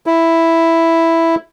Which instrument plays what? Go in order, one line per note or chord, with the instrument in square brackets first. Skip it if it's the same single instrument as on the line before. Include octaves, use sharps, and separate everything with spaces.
[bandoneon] E4